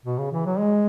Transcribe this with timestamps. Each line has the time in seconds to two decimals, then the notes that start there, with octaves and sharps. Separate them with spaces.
0.06 B2
0.19 C#3
0.32 E3
0.46 F#3
0.59 G#3